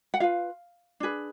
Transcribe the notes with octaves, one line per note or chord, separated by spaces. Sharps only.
F#5
F4 B4 F5
D4 G#4 B4